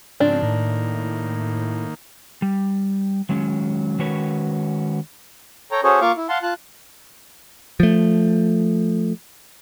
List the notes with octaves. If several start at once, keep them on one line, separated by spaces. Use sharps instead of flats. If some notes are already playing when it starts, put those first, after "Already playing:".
G#2 C#3 F3 C4 D4
A2 D#3 A#3
G3
D#3 F#3 G#3 C#4
D#3 G#3 C#4 F#4 B4 C#5
A4 C#5 G5 A#5
C#4 F#4 G#4 A4 C5 C#5
A#3 F4 F5 C#6 D6
E4
F5 F#5 A5 C6
F4 A5 F#6
F3 A3